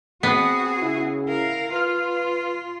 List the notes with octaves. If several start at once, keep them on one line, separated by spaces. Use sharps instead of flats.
B3 C4 F#4 G#4
C#3 E4
A#4 F5
F4 B4 F5 F6